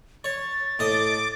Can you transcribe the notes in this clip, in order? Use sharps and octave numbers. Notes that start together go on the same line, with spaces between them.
C#5 A6
A2 D#5 D6